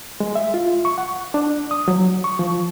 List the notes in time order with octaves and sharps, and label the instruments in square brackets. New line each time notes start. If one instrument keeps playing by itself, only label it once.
[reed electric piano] G#3
E5
F4
C#6
F#5
D4
D#6
F#3
C#6
F3